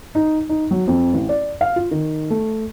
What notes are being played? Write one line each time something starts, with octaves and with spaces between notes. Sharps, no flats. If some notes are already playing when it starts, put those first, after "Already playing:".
D#4
D#4
F#3
F2
A1
D5
F5
F4
D#3
A3